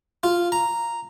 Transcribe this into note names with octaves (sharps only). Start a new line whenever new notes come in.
F4
A#5